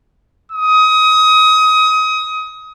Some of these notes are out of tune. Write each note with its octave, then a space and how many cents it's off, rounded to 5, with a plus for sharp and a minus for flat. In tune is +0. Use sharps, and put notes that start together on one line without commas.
D#6 +25